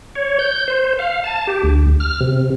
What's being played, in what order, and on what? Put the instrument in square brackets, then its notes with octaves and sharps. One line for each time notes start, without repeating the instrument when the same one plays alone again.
[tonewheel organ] C#5
G6
C5
F5
A5
G4
D2
F6
C3